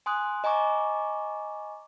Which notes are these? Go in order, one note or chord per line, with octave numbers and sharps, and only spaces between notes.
G#5 C6 D#6 F#6
D#5 G#5 A#5 C#6 D6